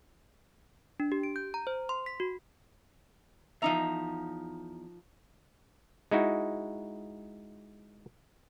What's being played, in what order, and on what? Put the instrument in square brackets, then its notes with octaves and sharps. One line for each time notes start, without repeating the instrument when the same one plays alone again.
[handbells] D4
G4
D7
G6
A#5
C5
C6
B6
F#4
[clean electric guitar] E2 A#5 [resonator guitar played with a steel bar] F3 D#4 E5
[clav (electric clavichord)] G#3 D#4 E4 F#4